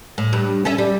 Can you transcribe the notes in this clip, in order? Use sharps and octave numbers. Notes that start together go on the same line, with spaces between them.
A2
G2
C#4 A4 E5
G3